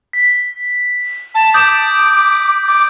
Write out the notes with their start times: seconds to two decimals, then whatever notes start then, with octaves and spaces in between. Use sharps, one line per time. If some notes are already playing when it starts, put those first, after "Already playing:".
0.13 B6
1.35 A5
1.54 D6 D#6 G6
2.68 D6